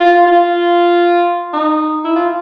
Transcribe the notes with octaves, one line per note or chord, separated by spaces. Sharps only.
F4
F4
D#4
E4
F4